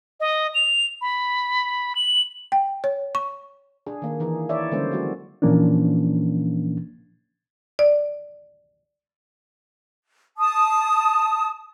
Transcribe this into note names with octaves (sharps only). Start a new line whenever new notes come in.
D#5
F7
B5
F#7
G5
C#5
C#6
D4 G#4
D#3 A#3
E3 D#4 G#4
E4 C#5 D5 E5
D3 G3 G#3 A#3 C#4 C5
F#3 A#3 F#4
A#2 E3 F3 A#3 C#4 D4
D5
A5 D#6